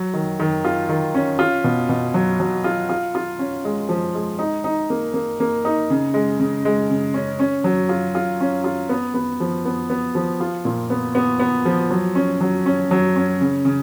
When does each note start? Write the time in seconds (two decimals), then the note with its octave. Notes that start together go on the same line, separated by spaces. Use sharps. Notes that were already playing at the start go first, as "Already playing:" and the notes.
Already playing: F#3
0.13 D#3
0.40 D#3
0.65 F4
0.89 D#3
1.15 C#4
1.39 F4
1.64 B2
1.89 B2
2.14 F#3
2.40 F#3
2.64 F4
2.89 F4
3.15 F4
3.39 C#4
3.65 G#3
3.89 F3
4.15 G#3
4.39 D#4
4.64 D#4
4.90 A#3
5.14 A#3
5.40 A#3
5.65 D#4
5.90 C#3
6.14 G#3
6.40 C#3
6.65 G#3
6.90 C#3
7.14 C#4
7.39 C#4
7.64 F#3
7.89 F4
8.15 F4
8.40 C#4
8.64 F4
8.89 B3
9.14 B3
9.40 F3
9.65 B3
9.90 B3
10.15 F3
10.40 F4
10.65 A#2
10.90 B3
11.15 B3
11.40 B3
11.65 F3
11.91 F#3
12.15 C#4
12.41 F#3
12.66 C#4
12.91 F#3
13.16 C#4
13.41 C#3
13.65 C#3